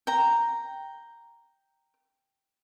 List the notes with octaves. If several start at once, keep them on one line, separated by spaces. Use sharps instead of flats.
G5 A#5